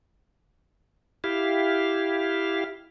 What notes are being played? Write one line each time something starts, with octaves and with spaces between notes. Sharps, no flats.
E4 G4 F5